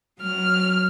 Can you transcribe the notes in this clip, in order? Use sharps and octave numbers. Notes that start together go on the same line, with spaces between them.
F#3 F6